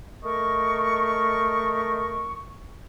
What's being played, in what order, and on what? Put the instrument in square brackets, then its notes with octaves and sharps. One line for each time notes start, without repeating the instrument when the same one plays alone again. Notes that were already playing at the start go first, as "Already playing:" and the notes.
[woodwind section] A3 A#4 D#5 C#6